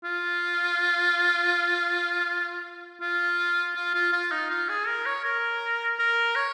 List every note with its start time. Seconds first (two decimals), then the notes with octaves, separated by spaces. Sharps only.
0.04 F4
3.01 F4
3.76 F4
3.94 F4
4.12 F4
4.31 D#4
4.50 F4
4.69 G#4
4.87 A#4
5.06 C#5
5.24 A#4
5.99 A#4
6.36 C#5